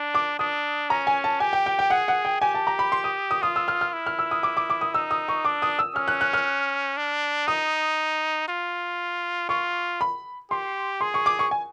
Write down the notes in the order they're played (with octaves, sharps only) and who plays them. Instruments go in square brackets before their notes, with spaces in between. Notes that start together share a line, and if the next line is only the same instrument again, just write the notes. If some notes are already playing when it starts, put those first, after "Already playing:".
Already playing: [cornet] D4
[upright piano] D6
[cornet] D4 [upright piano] D#6
[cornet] C#4 [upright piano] A#5
[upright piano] G#5
A5
[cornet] G4 [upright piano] G#5
[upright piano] G5
G5
G5
[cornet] G#4 [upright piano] F#5
[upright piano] F#5
G5
[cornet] G4 [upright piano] G#5
[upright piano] A5
A#5
B5
C6
D#6
D#6
[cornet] F4 [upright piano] D#6
[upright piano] E6
F6
F6
[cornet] E4
[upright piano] F6
E6
D#6
D6
D6
D6
D#6
[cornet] D#4 [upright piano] E6
[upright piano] D#6
C#6
[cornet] D4 [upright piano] D6
[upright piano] D#6
E6
[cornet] C#4 [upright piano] F6
[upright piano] F#6
F#6
F6
[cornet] D4
[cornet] D#4 [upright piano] D#6
[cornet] F4
[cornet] F4 [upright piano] C#6
[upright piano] B5
[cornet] G4 [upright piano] C6
[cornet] G#4 [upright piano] C6
[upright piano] C#6
D6
C#6
G#5